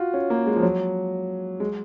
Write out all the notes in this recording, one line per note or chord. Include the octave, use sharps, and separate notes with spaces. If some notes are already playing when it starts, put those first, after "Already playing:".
Already playing: F4 F#4
C#4
A#3
G#3
F3
F#3
G#3